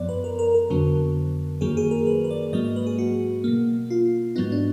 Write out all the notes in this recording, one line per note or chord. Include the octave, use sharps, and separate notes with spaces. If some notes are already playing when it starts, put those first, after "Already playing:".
Already playing: F#2 F3 B3 D5
B4
A#4
A#4
A#4
F2 D3 F#3 B3
F#2 D#3 F#3 A#3 G#4
G#4
A#4
B4
B4
D5
G#2 F#3 A#3 D#5
D#5
B4
G#4
F#4
B2 A#3
F4
G#2 F#3 B3 D#4
D4